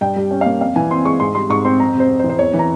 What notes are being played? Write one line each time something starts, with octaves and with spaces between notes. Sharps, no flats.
G2 G5
G3
C#4
A#3 F5
F2 F5
E3 G#5
C4 C6
G#3 C#6
G#2 C6
G3 C6
G#2 C#6
C4 C6
F2 A#5
C3
C5
F2
C5
E3
C5
E2 C#5
E3
A#5